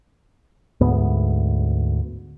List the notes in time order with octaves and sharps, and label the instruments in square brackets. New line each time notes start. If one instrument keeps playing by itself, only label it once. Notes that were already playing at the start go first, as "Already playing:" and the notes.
[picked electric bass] D2 G#2 B3